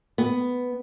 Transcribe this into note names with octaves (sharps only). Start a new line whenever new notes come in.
B3